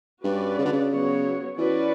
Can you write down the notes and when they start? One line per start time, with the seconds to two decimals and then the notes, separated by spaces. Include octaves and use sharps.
0.24 G2 C#4 F#4 B4 D5
0.58 C#3
0.65 D3
0.73 C#3
0.91 F#3 B3 F#4 C#5
1.58 E3 C#4 F#4 B4 D5